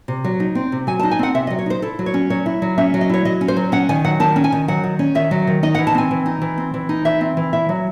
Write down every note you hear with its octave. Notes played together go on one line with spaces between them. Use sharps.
C3
F#3
D#4
C4
C3
F#3 G#5
A5
D#4
G#5
C4 F#5
C3 E5
D#5
F#3
C#5
D#4 C5
E4 A4
F#3
C#5
C#4
F#3 C#5
E4
F#3
C#4 E5
F#3
D#5
E4 C#5
F#3 D#5
C#4
C5
F#3
C#4 F#5
D#3 G#5
F#3 F#5
D#3 A5
C#4
G#5
D#3
F#3 F#5
D#3
C#4
D#3 E5
F#3
D#3
D#4 D#5
F#5
E3
A5
C4 G#5
E3
D#4
E3
C4
E3
D#4
E3 E5
C4
E3
E4 E5
F#3